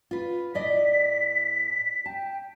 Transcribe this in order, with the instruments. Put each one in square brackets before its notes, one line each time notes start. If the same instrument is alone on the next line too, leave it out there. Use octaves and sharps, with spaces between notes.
[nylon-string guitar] F4 B4
[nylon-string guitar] A2 D5 D#5 [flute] B6
[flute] G5 [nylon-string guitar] A5